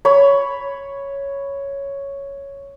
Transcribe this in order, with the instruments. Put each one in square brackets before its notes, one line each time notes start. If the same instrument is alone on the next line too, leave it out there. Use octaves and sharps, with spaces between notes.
[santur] C#5 B5